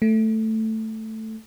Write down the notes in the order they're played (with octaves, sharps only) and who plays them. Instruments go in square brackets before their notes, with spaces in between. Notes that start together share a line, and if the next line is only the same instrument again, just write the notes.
[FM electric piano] A3